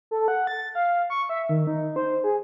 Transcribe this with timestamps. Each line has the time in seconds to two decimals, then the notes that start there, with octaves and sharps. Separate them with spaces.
0.11 A4
0.28 F#5
0.47 A6
0.75 F5
1.10 C#6
1.29 E5
1.49 D#3
1.67 D#4
1.96 C5
2.24 G#4